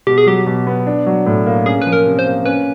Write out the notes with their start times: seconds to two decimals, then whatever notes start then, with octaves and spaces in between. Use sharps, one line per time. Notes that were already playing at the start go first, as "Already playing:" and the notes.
0.07 B2 G4
0.18 G#4
0.26 F#3 G4
0.46 B2
0.67 B3
0.87 D4
1.06 F#3
1.26 A2
1.46 A#3
1.66 C#4 G#4
1.82 F3 B4
1.93 A#4
2.06 C3
2.19 C5
2.25 A#3
2.45 C#4 B4